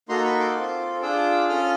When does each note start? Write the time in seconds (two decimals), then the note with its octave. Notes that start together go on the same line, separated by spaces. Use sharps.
0.08 A#3 D#4 F#4 A4 A#5 C6
0.24 B5 C#6
0.39 C6 D6
0.56 C4 F4 A4
1.02 D4 F4 G#4 D6 E6
1.49 C#4 F4 A4 D#6 F6